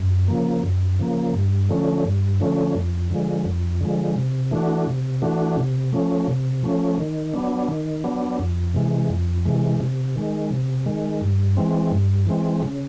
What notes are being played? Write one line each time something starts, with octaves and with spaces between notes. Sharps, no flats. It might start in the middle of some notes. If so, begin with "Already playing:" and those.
Already playing: F#2
C#3 F3 A#3
F#2
C#3 F3 A#3
G2
D3 F3 A3 C#4
G2
D3 F3 A3 C#4
F2
D3 F3 G#3
F2
D3 F3 G#3
C3
E3 A3 D4 F#4
C3
E3 A3 D4 F#4
C3
F3 A3 C#4
C3
F3 A3 C#4
D#3
F#3 B3 D4
D#3
F#3 B3 D4
F2
C3 E3 G#3
F2
C3 E3 G#3
C3
D#3 G#3
C3
D#3 G#3
G2
E3 G#3 C4
G2
E3 G#3 C4
C#3